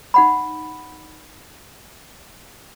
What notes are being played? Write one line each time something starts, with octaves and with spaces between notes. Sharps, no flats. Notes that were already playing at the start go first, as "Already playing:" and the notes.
D#4 F#5 B5